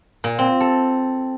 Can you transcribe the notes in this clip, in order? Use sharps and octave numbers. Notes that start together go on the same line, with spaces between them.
A#2
C4
A4